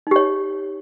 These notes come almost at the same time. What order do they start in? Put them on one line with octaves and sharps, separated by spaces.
D#4 G4 C#5